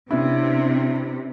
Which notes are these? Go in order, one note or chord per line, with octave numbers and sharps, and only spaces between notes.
C3 B3 C#4 D4 E4